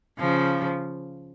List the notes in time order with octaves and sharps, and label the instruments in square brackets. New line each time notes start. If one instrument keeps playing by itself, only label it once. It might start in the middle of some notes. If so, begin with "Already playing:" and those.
[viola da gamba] C#3 F3